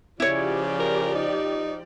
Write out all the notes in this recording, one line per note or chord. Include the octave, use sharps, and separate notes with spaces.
C#3 F3 E4 G4 C#5 D5
A#4
D#4